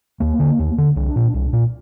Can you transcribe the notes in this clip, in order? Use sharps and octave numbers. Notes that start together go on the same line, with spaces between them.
D#2 A#3
D3
D#2
D3
C2 D4
A#2
C2
A#2